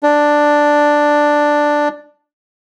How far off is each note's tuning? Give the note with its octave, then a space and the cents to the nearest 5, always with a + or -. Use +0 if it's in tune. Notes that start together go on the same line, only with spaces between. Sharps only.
D4 +5